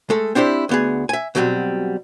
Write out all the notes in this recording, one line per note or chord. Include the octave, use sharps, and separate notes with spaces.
G#3 A3 A4
C4 D4 E4 G4 C5
D2 B3 G#4
E5 G#5
B2 D3 F#3 G3 C4